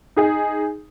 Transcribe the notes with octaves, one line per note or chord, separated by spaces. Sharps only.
D#4 G#4